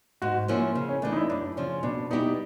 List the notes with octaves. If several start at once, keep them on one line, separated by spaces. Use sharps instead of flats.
G#2 F#4
F3 A#3 C#4 E4
C#3
C#4
E3 A3 D4
D#4
E4
F#2 D4
C#3 F3 C#4
B2 D4
G3 B3 D#4 E4 G4